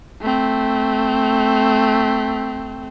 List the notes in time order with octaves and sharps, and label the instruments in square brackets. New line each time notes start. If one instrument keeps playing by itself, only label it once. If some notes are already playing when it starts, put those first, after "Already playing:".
[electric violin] A3 C4